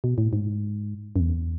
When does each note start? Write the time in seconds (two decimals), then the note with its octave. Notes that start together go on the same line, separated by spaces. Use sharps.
0.04 B2
0.18 A2
0.33 G#2
1.16 F#2
1.20 E2